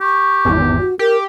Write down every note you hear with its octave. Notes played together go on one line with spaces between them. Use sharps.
G4 C#6
G#1 E2
F#4
G4 A#4